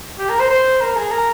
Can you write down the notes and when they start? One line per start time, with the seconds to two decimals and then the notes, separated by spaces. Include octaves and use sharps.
0.19 G4
0.29 A#4
0.39 C5
0.50 C5
0.81 A#4
0.96 G#4
1.11 A#4